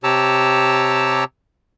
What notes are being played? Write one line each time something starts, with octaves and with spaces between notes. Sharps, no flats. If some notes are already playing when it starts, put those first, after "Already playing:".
C3 G4 C#5 A5 A#5 E6